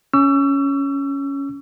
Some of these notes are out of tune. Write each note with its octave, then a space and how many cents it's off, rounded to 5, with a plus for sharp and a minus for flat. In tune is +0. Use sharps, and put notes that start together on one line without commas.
C#4 +5 C#6 +35 E6 +30